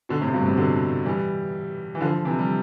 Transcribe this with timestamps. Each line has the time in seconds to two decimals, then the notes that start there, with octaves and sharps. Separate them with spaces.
0.09 B2 D3
0.21 A2 C3
0.34 G2 B2
0.45 A2 C3
0.57 B2 D3
1.05 E3 G3
1.95 E3
2.01 D3 F3
2.25 C3 E3
2.39 G3